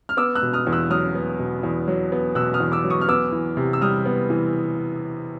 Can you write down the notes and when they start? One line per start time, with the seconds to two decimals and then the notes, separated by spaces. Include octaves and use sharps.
0.09 F6
0.17 B3 D6 E6
0.35 E6 F#6
0.42 B2
0.53 D#6 F6
0.67 E2
0.72 E6 F#6
0.90 F#3 D#6 F6
1.15 B3
1.39 B2
1.63 E2
1.88 F#3
2.12 B3
2.35 B2 E6 F#6
2.54 D#6 F6
2.60 E2
2.72 D6 E6
2.84 F#3
2.90 C#6 D#6
3.01 F6
3.08 B3 D6 E6
3.32 E3
3.57 C3
3.73 E6
3.81 G3 D#6 F6
4.06 B3
4.30 E3